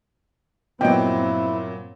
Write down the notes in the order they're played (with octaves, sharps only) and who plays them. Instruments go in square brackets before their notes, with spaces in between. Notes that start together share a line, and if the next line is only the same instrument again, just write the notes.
[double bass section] G2 C4 [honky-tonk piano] A#2 F#3 [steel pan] B3 D#5 G5 [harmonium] E4